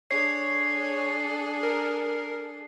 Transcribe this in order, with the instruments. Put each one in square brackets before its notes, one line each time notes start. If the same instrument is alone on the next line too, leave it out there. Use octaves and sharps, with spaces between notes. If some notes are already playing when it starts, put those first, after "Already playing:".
[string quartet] D4 G#4 A4 [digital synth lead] C#5 [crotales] C7
[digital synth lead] A#4